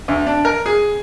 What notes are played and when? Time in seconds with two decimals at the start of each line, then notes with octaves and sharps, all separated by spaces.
0.08 D2
0.27 D4
0.45 A#4
0.66 G#4